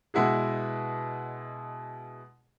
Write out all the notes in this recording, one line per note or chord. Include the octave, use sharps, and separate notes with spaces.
B2 G#3 E4 F#4 G#4